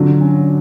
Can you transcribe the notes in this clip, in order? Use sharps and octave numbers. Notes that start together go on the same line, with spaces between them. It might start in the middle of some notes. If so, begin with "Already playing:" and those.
Already playing: D3 F#3 F4
C#4